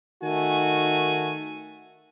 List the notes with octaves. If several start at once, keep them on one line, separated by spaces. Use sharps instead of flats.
D#3 A3 F#4 G#5